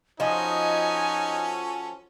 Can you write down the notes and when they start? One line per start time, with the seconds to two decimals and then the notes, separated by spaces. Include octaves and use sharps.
0.20 F3 C#4 D#4 F#4 A4 D#5 G#5